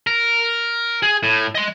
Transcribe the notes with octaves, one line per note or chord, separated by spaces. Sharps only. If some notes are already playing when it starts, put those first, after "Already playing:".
A#4
G#4
A2
D#5 C6